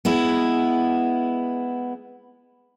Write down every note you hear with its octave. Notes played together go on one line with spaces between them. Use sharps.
G#3 B3 E4